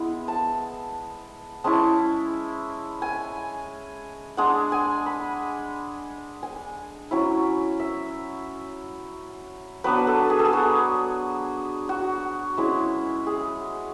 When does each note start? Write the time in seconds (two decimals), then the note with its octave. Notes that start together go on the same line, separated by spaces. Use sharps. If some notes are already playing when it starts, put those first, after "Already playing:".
Already playing: G#3 B3 E4
0.28 A5
1.64 G#3 C#4 E4 A5
3.02 G#5
4.37 G#3 D4 F#5
4.72 G#5
5.06 B5
6.43 G#5
7.11 F#3 C#4 E4
7.79 E5
9.84 F#3 B3 D4 B4
10.07 A4
10.30 G#4
10.39 A4
10.45 G#4
10.53 F#4
11.89 F#4
12.57 G#3 C#4 E4
13.27 G#4